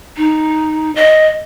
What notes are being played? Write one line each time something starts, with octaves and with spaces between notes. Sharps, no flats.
D#4
D#5